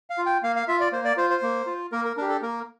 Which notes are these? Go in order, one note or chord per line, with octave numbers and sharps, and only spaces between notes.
F5
F4
G5
A#3 F5
F5
F4 E5
D5
A#3 C5
D5
F4 C5
C5
A#3
F4
A#3 A#4
A#4
D4 G4 A#4
A4
A#3 A#4